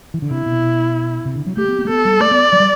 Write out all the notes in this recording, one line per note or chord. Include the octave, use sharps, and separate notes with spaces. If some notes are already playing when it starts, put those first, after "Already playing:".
E3
D3
C3 E4
B2
C3
D3
F#3
A3 G4
B3
B3
A3
B3 A4
G3
A3 D5
B3
F#3
G3